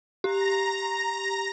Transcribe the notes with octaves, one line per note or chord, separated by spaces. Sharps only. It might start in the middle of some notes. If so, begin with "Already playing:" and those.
G4 A#5 A#6